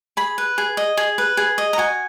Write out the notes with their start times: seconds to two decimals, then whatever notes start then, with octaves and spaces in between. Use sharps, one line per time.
0.17 G#4 B5
0.38 B4
0.58 G#4
0.77 D#5
0.97 G#4
1.18 B4
1.37 G#4
1.58 D#5
1.73 A#5
1.78 F#4 G#5